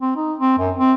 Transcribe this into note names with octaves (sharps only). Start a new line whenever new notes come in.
C4
D#4
C4
F#2
C4